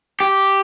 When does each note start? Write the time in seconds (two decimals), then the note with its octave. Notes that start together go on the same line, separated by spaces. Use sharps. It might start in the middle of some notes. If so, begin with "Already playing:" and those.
0.20 G4